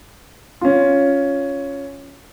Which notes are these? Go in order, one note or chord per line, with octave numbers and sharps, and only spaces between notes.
C#4 F4